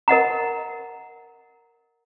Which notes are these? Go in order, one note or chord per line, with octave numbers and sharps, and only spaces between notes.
A#4 D#5 F#5 A#5